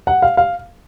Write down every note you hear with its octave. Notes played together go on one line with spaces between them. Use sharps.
F#5
F5
F5